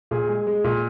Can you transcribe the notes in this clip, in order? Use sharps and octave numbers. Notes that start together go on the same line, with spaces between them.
A#2 G#4
G#3
G#3
A#2